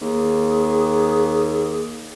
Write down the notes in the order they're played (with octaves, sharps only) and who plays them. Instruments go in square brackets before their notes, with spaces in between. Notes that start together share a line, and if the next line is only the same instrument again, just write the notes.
[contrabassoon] D#2 [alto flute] G#4